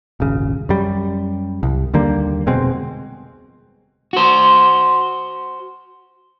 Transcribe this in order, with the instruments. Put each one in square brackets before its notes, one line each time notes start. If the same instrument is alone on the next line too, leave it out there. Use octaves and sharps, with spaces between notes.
[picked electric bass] D#1 G#1 C#3
F#2 G3
C2
D#2 D3 G3 A#3
F1 B2 G#3 C4
[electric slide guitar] F#4 C5